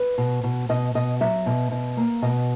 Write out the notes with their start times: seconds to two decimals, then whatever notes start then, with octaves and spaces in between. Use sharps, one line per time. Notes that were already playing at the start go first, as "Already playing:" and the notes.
Already playing: B4
0.18 B2
0.44 B2
0.69 B2 D#5
0.95 B2 D#5
1.21 F#3 E5
1.46 B2
1.71 B2
1.97 A#3
2.22 B2 D#5